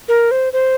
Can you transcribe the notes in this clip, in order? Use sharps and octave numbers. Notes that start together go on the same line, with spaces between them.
A#4
C5
C5